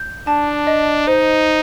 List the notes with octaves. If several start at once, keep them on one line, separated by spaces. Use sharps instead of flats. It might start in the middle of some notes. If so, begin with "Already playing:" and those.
Already playing: G6
D4 A5
D#5
D#4 C5